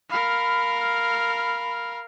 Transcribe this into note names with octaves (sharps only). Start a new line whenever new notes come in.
A#4 F5 B5